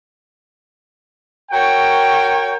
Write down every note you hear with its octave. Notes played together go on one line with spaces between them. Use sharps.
F#4 A#4 C#5 G5